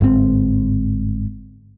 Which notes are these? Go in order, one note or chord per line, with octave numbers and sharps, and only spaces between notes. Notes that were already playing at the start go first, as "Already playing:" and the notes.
G1 G#2 B2 C4